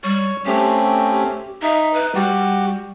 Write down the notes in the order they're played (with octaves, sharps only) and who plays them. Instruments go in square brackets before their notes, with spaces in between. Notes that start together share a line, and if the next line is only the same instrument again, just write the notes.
[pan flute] G3 [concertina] C#5 C#6
[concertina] A3 C4 C#4 [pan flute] G4
[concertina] D#4 [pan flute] E5
[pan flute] B4
[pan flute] G3 [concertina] F#4 G4